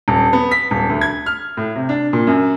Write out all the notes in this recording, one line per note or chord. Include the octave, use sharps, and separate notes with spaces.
D#1
B3
B6
D#1
D2
G#6
F6
A2
C3
D4
A#2
F#2